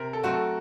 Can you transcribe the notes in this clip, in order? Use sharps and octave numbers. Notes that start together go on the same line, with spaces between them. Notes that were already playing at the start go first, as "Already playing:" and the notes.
Already playing: C3 A#4
A4
F#3 A3 C4 F#4
A4